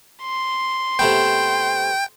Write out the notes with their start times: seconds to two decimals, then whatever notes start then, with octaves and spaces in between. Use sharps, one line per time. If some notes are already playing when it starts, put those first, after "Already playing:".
0.23 C6
0.99 C3 A3 B3 G5